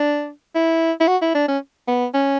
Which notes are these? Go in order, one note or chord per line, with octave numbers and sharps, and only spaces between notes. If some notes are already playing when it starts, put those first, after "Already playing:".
Already playing: D4
E4
E4
F#4
E4
D4
C#4
B3
C#4